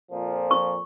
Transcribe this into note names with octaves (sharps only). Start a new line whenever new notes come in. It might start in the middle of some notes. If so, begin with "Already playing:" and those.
F2 A#2 F3
C#6